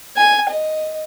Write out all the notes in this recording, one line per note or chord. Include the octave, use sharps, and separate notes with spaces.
G#5
D#5